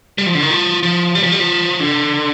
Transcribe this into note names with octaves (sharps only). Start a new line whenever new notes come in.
G3
F3
D3
D#3
F3
F3
G3
F3
G3
F3
D3